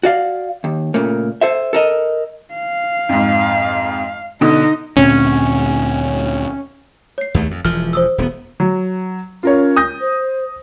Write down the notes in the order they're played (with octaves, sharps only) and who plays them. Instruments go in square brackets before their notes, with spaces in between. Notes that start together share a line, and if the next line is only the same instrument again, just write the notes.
[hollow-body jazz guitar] F#4 D5 F5
D#2
A#2 C#3 A3 A#3
A4 C5 E5
A4 A#4 D#5
[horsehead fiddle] F5
[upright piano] F2 G#2
[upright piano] B2 D3 [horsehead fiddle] D#4 D#5
[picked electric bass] D2 A#2 C4 [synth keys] C#4
[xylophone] C#5 C7
[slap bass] D#2 A3
F2
[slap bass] E1 E3 F3 [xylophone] F6
[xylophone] C5 D#6 E6
[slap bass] D#1 A#3 B3
[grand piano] F#3
[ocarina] C#4 [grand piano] F4 A#4 C#5
[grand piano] D#6 G6 A#6
[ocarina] C5